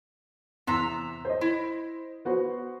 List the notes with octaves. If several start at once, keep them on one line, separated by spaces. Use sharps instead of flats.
E2 C3 E5 A#5
C5 D#5
E4
B3 F#4 C5